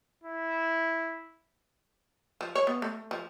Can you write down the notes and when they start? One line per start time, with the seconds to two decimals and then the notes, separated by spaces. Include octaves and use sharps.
0.24 E4
2.41 F3
2.55 C#5
2.67 B3
2.82 A3
3.11 F3